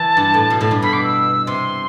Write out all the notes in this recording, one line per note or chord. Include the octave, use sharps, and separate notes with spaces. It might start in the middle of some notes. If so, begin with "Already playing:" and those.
Already playing: E3 A5
G2
A2
B2
A2
G2
B2 B5
D6
E6
C3 C6